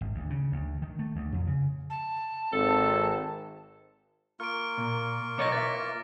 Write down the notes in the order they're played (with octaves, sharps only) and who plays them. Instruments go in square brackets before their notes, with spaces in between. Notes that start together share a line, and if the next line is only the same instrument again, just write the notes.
[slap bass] G#1
D2
C#3
D2
D#3
A3
D2
F2
C#3
[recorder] A5
[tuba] G#1 [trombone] C4 [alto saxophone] A4
[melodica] A#3 F4 C#6 [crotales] F6 D7
[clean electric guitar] A#2
[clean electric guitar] B2 C#5 D#5 [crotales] D6 A#6
[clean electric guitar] B4 D#5 E5 [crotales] A6